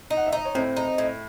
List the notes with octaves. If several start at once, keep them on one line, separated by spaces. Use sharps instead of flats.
D#4
F#5
E5
D#4 D#5
C#5
A2 C4 C5
D#4
A2